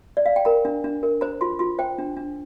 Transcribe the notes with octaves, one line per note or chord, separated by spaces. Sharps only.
D5
F5
G5
A#4 A#5
D4
D4
A#4
C5 A#5
F4 C6
F4 C6
C5 G5
D4
D4